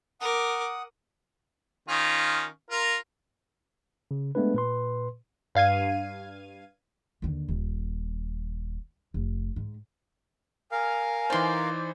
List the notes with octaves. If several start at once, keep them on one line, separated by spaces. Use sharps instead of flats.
A#4 F#5 D6 D#6
D#3 C#4 F4
F4 A#4
C#3
G#3 A3 B3 D4 B4
A#2 B4 C6
G2 F5 G#6 D#7
D#2 D3
D#1
F1
G#2
A#4 F5 G#5
E3 D#4 C5 D5 C6